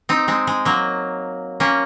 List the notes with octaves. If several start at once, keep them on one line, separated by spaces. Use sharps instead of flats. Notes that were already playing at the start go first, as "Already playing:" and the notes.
C4 D#4
G#3 C4
G#3
F#3 A#3
A#3 C#4